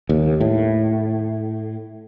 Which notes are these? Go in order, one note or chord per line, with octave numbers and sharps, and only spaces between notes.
D#2
A2